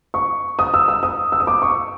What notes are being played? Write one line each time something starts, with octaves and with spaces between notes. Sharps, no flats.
C#6
D#6
E6
E6
D#6
E6
D#6
D6
C#6